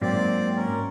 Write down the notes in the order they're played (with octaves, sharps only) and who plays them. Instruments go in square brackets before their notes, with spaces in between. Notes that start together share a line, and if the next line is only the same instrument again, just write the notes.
[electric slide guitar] G#2 F#3 A#3 [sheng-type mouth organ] C4 D5
[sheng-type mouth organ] C#4 A#4